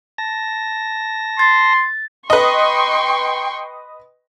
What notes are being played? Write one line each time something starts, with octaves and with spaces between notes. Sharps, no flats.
A5 A#6
C6 A6
B4 D#5 G5 C6 C#6